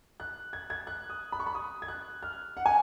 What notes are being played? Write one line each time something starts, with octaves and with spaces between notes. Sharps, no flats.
F#6
G#6
G#6
F#6
D#6
B5
C#6
B5
D#6
G#6
F#6
F6
F#5
G#5